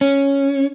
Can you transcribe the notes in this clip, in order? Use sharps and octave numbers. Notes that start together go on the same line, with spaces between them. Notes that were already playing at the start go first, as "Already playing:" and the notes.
C#4